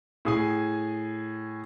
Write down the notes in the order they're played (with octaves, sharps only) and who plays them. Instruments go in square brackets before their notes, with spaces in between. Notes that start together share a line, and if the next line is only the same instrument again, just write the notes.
[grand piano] A2 G#4 G#5